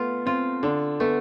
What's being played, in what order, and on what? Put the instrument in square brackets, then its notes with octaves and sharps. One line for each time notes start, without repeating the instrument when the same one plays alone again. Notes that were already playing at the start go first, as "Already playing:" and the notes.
Already playing: [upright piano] A3 B3 [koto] F4
[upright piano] C4 [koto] F4
[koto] D3 [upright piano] D4
[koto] A3 [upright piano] B3